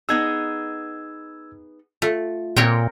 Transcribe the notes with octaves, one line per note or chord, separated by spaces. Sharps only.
B3 D#4 G#4 E6 G#6
A3 F4
A#2 C4 A#4 C#5 G5